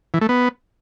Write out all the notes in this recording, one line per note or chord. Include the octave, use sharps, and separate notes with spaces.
E3
A3
B3